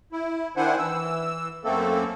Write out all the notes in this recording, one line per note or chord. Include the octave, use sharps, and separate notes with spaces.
E4
D#3 D4 E4 C5 F#5 G#5
E3 E6
F#2 A3 A#3 C4 A4